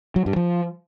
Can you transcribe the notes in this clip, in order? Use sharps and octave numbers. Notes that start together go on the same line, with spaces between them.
F#3
G2
F3